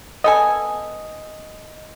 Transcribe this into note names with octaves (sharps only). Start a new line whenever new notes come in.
B3 A4 D#5 G#5